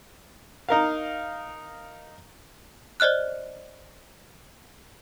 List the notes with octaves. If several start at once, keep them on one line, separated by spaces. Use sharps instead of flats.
D#4 A#4 F5
C5 D5 D#5 F6 F#6